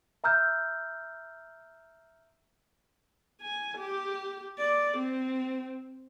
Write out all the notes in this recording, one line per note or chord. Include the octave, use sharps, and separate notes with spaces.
E5 A#5 E6 F6 G6
G#5
G4
D5
C4